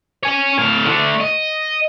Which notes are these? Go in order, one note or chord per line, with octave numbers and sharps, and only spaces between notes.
C#5 G#5
A2 F5
D3 A3
D#5